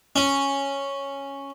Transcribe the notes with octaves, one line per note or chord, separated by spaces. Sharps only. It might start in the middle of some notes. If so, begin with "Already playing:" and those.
C#4